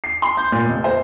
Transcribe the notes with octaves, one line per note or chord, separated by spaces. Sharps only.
C7
C6
G6
A#2
F1
C5